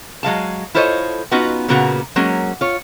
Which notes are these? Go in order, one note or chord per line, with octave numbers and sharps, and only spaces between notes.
F#3 G#3 F5 A5
E4 F4 A4 C5 C#5 D#5
B3 C#4 D#4 F4 F#4
A#2 C#3 A#3 B3 F#4 A#5
F#3 G#3 A#3 C#4
F4 C#5